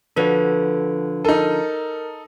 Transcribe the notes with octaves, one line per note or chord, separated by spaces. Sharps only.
D3 F3 F#4 A4 B4 C#5
D#4 A4 A#4